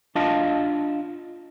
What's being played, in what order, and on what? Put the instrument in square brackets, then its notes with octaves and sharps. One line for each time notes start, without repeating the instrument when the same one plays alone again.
[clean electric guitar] D4 F4 D#5 F5 A5